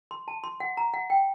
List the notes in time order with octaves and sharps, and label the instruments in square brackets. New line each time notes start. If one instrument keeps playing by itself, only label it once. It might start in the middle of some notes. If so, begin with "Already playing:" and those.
[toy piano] C6
A5
C6
F#5
A#5
F#5
G5